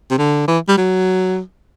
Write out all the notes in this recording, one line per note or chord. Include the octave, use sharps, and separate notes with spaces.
C3
D3
E3
G3
F#3